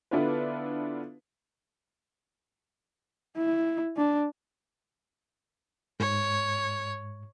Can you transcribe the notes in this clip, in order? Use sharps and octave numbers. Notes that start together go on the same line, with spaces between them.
D3 B3 D4 E4 F4 B4
E4
D4
G#2 C#5